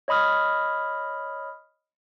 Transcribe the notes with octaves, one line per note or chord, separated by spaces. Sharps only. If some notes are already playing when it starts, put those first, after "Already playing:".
C#5 D#5 B5 D#6 F6